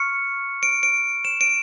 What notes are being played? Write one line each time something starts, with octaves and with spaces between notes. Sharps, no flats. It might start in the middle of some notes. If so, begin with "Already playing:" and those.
Already playing: C#6 F6 C#7
D7
D7
E7
D7